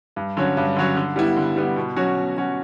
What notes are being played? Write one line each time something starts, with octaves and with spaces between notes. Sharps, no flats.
G2
D3 F#3 C#4
G2
D3 F#3 C#4
D3
G3 B3 E4
D3
G3 B3 E4
B2
F#3 C#4 F#4
B2
F#3 C#4 F#4